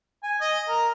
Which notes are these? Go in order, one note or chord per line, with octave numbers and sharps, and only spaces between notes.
G#5
D#5
A#4